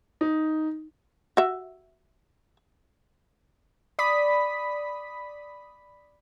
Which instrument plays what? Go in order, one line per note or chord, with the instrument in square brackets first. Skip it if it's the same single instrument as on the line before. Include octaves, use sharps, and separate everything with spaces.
[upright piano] D#4
[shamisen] F#4 E5
[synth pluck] D5 B5 D#6 B6